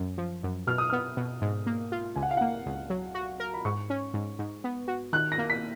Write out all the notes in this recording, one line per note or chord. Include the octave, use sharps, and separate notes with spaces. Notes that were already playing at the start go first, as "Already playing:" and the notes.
Already playing: F#2
F3
F#2
B2 F6
D#6
B3 F6
B2
G#2
A#3
F4
C#2 G#5
F#5
F5
A#3 F#5
C#2
F#3
F#4
A#4
B5
G#2 C#6
C#4
G#2
G#2
B3
F#4
D#3 F#6
A#6
A#3
B6